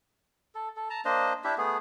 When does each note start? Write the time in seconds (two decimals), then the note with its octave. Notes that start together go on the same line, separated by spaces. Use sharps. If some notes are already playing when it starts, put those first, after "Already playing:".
0.55 A4
0.76 A4
0.90 A5 A#5
1.05 A#3 D4 C5 D#5
1.44 D4 E4 G4 E5
1.58 A3 B3 G#4